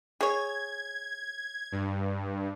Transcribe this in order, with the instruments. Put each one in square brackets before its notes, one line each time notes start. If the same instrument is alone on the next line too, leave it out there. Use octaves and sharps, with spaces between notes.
[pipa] G#4 C#5 [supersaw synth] G#6
[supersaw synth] G2